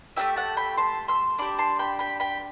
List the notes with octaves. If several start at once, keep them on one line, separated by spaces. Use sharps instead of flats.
A3 D4 G4 E5 G5
F#5 A5
G5 B5
A5 C6
C6 E6
D4 G4 B5 D6
A5 C6
G5 B5
G5 B5
G5 B5